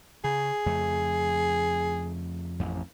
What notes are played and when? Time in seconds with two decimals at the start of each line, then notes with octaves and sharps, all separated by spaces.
0.24 C#3 G#4
0.66 F2 C#3 A3
2.60 A1 F2